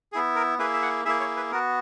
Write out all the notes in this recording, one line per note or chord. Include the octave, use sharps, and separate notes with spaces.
B3 E4 G#4
A#4
A#3 E4 G#4 B4
E5
F#5
A#3 E4 G#4 E5
C#5
B4
B3 F#4 A#4